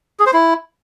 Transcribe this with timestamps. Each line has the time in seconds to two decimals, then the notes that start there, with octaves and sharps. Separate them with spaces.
0.20 G#4
0.26 C5
0.33 E4